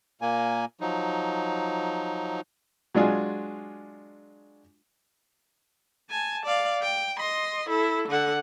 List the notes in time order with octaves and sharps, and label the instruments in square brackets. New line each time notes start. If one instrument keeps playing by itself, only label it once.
[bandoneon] A#2 A#3 G#5
F3 F#3 D#4
[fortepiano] F#3 G#3 D4 F4 G#4
[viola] G#5 A5
D5 F5
G5
D#5 C6
E4 A4
D3 F#5